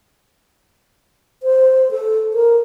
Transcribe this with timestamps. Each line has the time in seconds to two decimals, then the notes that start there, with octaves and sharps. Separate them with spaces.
1.43 C5
1.91 A4
2.34 A#4